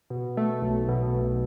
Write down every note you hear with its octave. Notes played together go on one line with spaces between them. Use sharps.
B2
A3
B1
B2
B1